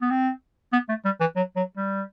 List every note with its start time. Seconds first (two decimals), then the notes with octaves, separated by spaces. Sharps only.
0.02 B3
0.10 C4
0.73 B3
0.89 A3
1.05 G3
1.20 E3
1.36 F#3
1.56 F#3
1.77 G3